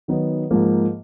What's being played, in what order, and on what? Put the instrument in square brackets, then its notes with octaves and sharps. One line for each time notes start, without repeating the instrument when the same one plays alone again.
[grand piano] D#3 F#3 B3 D#4
G#2 F3 A#3